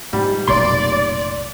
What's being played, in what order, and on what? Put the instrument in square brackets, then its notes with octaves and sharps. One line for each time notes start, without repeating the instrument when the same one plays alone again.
[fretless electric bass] G#2 [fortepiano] G3
[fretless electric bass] F1 B1 A#2 [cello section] D5 [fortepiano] C6